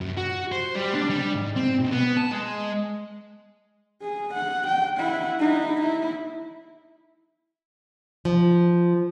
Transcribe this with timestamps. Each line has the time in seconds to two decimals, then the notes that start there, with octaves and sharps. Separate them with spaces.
0.01 F#2
0.17 F#4
0.52 C5
0.76 G3
0.95 D4
1.10 G3
1.35 G#2
1.56 C4
1.79 B1
1.91 B3
2.17 A5
2.31 G#3
4.02 G#4
4.34 F#5
4.67 G5
4.98 E4 F#5
5.39 D#4 E4
5.82 E4
8.25 F3